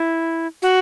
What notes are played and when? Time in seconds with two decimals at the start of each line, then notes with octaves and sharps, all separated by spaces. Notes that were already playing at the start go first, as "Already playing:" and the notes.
Already playing: E4
0.62 F#4